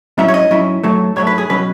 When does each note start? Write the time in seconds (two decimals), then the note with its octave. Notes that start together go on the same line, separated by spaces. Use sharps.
0.18 G#2 F#3 C#4 E4 E5
0.28 C#5
0.34 D#5
0.51 G#2 F#3 C#4 E4
0.83 G#2 F#3 A3
1.16 G#2 F#3 A3 C#5
1.27 B4
1.38 G#4
1.49 B2 F#3 C#4 B4